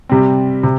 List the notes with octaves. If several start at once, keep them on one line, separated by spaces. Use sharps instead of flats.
C3 G3 C4
C3